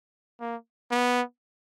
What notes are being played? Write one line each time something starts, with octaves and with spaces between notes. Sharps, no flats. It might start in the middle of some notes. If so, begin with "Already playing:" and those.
A#3
B3